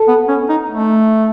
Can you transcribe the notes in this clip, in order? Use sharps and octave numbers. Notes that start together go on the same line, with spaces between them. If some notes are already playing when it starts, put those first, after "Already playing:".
Already playing: A4
B3
C#4
D#4
A3